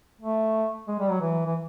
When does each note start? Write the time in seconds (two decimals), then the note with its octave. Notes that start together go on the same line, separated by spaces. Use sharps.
0.21 A3
0.88 G#3
0.99 G3
1.10 F#3
1.21 E3
1.46 E3